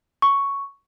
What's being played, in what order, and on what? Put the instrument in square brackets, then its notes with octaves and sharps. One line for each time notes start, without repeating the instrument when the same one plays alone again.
[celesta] C#6